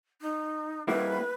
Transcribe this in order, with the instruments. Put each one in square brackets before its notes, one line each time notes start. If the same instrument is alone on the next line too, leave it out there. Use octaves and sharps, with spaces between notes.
[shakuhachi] D#4
[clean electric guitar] G3 A#3 E4 [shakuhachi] B4